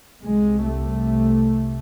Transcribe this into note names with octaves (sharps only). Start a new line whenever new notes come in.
C2 C3 G#3
A3